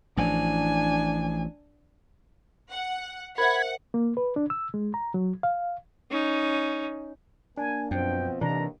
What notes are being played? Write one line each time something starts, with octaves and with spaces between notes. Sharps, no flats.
A1 E3 F3 D4 G#5
F#5
A#4 C5 E5 F#5 B5 G#6
A#3
B4
D4
E6
G#3
A#5
F#3
F5
C#4 D#4
A#3 D4 G#5
F#2 B2 F3 C4 G5
A1 D#2 C3 E3 D4 A#5